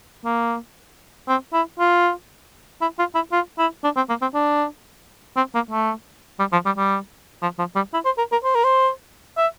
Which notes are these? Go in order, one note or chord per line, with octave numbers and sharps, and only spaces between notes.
A#3
C4
E4
F4
E4
F4
E4
F4
E4
D4
C4
A#3
C4
D4
C4
A#3
A3
G3
F3
G3
G3
F3
F3
G3
E4
C5
A#4
A#4
C5
A#4
C5
E5